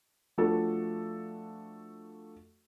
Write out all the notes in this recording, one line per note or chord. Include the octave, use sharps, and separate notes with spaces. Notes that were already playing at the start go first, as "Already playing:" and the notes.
F3 A3 D4 F#4 A4